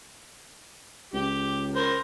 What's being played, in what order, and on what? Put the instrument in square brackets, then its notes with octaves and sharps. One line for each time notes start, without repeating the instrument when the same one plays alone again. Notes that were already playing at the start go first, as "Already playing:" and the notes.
[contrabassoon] C#2 [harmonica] G4
[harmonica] A#4 C5